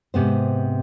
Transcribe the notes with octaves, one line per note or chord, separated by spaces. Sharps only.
G#2 C3 B3 C5